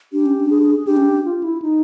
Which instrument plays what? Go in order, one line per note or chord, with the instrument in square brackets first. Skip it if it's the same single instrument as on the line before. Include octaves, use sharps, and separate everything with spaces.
[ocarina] D4 [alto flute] G4
[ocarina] C#4
D4
[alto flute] G#4
G#4
G#4
[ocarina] D4 [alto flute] G4
[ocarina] C#4
D4
[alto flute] F4
E4
D#4